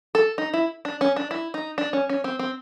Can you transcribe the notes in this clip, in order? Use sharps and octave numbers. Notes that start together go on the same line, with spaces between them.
A4
D#4
E4
D4
C#4
D4
E4
D#4
D4
C#4
C#4
C4
C4